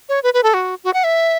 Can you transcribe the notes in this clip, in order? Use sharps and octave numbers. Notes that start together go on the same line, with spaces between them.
C#5
B4
B4
A4
F#4
F#4
F#5
E5